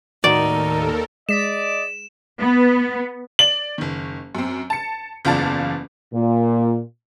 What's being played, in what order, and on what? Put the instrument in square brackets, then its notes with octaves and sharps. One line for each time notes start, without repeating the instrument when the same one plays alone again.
[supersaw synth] D#2 A4 A#4 [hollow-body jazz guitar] A2 D#3 F#4 [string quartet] D#4 [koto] D5
[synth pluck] G#3 B6 D7 [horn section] D5 D#5 [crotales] E7
[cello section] B3
[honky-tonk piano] D5 F#7
F#1 D#3
F#2 C4
A5 C#7
F#1 E2 F4 D5 A5
[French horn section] A#2